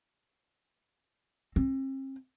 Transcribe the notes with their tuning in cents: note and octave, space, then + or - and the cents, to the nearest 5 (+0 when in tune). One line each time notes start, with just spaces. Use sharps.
C4 +40